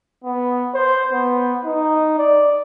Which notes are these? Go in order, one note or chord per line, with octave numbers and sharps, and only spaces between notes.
B3
C5
B3
D#4
D5